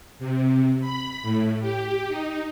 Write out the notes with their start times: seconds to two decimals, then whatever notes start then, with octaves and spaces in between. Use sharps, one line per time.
0.19 C3
0.81 B5
1.23 A2
1.61 G4
2.08 D#4